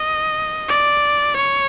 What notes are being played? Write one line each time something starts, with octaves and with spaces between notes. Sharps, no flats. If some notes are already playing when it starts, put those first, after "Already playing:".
Already playing: D#5
D5
C#5